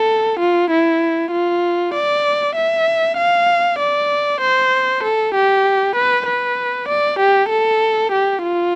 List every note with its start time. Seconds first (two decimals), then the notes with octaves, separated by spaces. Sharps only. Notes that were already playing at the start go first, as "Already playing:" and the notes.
Already playing: A4
0.40 F4
0.71 E4
1.32 F4
1.94 D5
2.56 E5
3.17 F5
3.80 D5
4.41 C5
5.03 A4
5.35 G4
5.96 B4
6.27 B4
6.89 D5
7.19 G4
7.50 A4
8.12 G4
8.43 F4